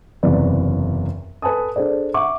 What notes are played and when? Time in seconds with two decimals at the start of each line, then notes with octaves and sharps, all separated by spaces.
0.23 F#1 E2 C3 B4 D5
1.42 A4 B4 G#5 A5 D#6
1.76 D4 G#4 A4 C5 D5
2.14 E5 F#5 C#6 D6